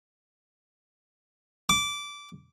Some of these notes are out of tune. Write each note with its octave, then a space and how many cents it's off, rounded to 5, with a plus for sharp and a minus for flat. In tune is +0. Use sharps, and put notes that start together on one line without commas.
D6 -15